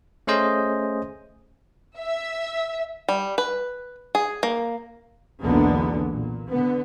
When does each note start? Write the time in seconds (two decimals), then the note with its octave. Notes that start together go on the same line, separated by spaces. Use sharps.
0.27 A3 C#4 G#4 C5 D#5
1.98 E5
3.08 G3
3.38 B4
4.15 G#4
4.43 A#3
5.42 B1 E2 D3 G#3 A#3 B3
6.08 A#2
6.50 D3 B3